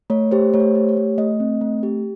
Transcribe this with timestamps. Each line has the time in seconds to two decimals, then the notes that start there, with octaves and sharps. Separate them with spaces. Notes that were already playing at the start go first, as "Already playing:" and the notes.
0.10 A3 C#5
0.31 G4 C5
0.54 A3 C#5
0.60 C5
0.75 G4
0.89 C#5
0.97 A3
1.18 A3 D#5
1.40 C4
1.61 A3
1.83 G4